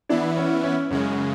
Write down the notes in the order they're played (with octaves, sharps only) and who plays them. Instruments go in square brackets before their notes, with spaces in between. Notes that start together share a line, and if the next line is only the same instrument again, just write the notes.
[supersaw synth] E3 B3 E4 [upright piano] D4
[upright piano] C#4
C#4
[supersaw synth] F#2 C#3 G#3 [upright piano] C#4